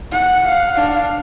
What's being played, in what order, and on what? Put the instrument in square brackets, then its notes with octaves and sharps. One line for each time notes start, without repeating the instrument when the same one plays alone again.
[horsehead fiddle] F#5
[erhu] F5
[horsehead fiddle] D4